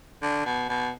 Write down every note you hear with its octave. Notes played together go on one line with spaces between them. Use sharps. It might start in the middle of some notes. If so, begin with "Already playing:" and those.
D3
B2
B2